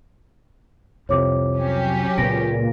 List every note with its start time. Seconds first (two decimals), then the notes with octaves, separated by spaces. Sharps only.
1.09 C2 F2 C3 C#5 D6
1.57 F#3 C#4 G4
2.18 C#2 A#2 G#3 B3 A#6 D7